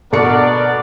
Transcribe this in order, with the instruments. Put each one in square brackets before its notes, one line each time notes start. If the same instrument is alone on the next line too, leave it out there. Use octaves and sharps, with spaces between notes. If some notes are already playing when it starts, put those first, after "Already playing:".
[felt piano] B2 C#7 [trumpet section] B3 D4 A#4 [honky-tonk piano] A4 C#6 [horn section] D5